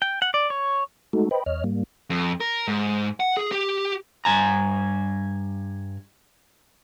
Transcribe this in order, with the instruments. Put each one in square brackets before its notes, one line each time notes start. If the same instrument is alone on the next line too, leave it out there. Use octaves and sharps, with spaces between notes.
[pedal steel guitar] G5
F#5
D5
C#5
[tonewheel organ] G#3 A3 D#4 F#4 A4
B4 C5 D#5 G5 B5
E2 C#5 D#5 F6
G#2 G3 A#3
[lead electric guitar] F2
A#4
G#2
F#5
G#4
G4
[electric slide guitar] G2 G#5 A#5